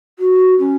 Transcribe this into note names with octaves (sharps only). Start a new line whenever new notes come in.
F#4
C#4